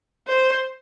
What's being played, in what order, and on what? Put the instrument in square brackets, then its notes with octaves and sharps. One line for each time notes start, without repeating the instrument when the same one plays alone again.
[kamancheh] C5